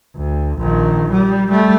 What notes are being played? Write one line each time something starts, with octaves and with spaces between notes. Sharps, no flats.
D2
A#1 D#3
G3
G3 A3